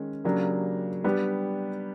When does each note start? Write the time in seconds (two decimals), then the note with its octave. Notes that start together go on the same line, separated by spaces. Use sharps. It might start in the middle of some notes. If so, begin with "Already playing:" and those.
Already playing: D#3 G#3 C#4
0.24 C#3 F#3 A#3 D4 G4
1.04 G3 B3 D4 G4